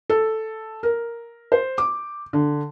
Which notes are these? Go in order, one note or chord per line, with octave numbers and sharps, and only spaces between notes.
A4
A#4
C5
D6
D3